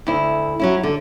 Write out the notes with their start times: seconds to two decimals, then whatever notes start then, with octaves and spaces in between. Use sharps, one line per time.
0.07 D2 E4
0.60 F#3 C#4 E4
0.83 D3